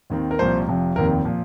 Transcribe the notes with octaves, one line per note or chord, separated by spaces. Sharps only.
D#2 D#3 C4
A#4
C2 A#2 F3 C4 C5
F1 F2 C3 F3
F1 D#2 D#3 C4 A#4
A#2 F3